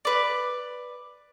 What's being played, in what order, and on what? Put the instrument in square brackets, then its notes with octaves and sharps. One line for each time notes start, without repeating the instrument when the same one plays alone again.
[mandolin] B4 D5